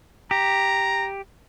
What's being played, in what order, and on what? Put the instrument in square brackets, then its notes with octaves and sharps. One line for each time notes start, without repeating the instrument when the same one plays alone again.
[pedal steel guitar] G4 [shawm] A#5